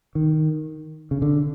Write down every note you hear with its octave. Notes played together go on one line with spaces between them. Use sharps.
D#3
C#3
D3